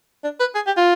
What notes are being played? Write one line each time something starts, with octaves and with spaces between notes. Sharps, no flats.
D4
B4
G#4
G4
F4